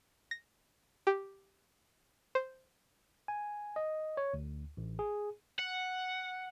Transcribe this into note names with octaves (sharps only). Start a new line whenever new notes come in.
A#6
G4
C5
G#5
D#5
C#5
D2
A1
G#4
F#5